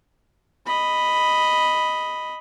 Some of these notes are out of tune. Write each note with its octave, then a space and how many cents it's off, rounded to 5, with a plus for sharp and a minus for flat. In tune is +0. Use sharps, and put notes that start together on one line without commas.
D#5 +0 B5 +0